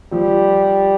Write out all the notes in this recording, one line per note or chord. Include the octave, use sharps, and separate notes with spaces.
F3 G3